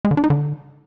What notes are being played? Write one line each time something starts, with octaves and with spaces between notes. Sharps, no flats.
G#3
D3
D4
D#4
D3